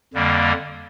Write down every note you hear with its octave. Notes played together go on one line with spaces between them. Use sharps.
F2 D3 G3 A#3